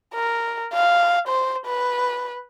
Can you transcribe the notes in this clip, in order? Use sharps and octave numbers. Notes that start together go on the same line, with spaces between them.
A#4
F5
C5
B4